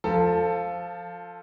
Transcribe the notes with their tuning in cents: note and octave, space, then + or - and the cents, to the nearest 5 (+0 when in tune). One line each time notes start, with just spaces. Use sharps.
F3 +0 A4 +15